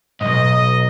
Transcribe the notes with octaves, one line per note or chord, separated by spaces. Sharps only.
B1 G#2 D#5